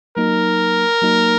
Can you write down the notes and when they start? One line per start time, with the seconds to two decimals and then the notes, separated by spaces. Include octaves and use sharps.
0.17 F#3 A#3 D#4 A#4
1.02 F#3 A#3 D#4